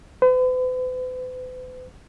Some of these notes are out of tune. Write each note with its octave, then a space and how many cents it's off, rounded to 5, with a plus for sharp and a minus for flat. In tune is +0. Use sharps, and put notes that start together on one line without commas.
B4 +45